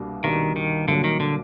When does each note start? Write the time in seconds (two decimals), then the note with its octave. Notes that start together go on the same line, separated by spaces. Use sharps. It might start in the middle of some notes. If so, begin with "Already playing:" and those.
Already playing: C2 B2 G3 A#3 D4
0.24 C2 B2 D#3 G3 A#3 D4
0.56 D#3
0.88 C2 A#2 D3 F#3
1.04 D#3
1.20 D3